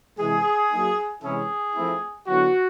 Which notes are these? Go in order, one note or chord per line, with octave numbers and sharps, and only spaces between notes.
C3 E3 G#3 G#4
F#3 A#3 D#4
C3 E3 G#3 C#4 E4 G#4
F3 A3 C4 E4
D3 F#3 B3 E4 F#4